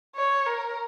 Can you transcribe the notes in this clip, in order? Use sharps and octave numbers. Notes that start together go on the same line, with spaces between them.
C#5
A#4